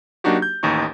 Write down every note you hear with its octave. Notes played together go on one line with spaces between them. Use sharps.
F#3 A#3 D4 D#4 F#4 G4
G6
A1 D#2 D#4 C#6